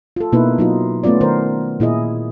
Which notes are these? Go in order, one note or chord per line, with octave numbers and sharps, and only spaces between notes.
F4 A4
B2 A#3 D#4 E4 B4
F#3 D#4 F4
A3 B3 C#4 F4 D5
D#3 A#4 C5
A#2 E4 G#4 D#5